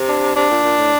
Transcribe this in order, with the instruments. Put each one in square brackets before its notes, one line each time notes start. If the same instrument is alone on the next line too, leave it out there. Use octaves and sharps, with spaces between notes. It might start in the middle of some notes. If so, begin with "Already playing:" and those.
Already playing: [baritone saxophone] C3
[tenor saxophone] D4
[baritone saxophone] C3 [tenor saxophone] D4
[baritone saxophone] A#2
A#2
A2